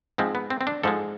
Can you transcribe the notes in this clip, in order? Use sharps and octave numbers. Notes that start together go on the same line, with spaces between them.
G#2 F3 G#3 C4
B3
C4
C4
D4
G#2 F3 G#3 A4